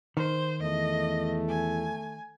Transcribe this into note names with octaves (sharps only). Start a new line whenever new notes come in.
D#3 C5
E2 A3 D#5
G#5